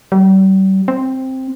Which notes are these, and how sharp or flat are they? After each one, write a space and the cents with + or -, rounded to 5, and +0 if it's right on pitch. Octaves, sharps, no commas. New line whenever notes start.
G3 -40
C4 +5